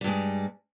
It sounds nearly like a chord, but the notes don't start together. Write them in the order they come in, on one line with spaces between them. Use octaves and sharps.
G3 G2 G#3